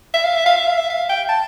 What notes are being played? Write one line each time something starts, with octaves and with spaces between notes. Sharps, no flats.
E5
F5
E5
F5
E5
F5
E5
F5
G5
A5